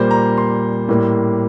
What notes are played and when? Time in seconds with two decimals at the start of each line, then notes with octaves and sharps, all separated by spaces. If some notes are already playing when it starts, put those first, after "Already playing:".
Already playing: A#2 G3 A#3 C5
0.11 A#5
0.37 C6
0.88 A2 G3 A#3